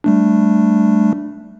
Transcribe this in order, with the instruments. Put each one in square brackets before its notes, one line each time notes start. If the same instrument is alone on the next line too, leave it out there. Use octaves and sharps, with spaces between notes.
[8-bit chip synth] G3 A3 D4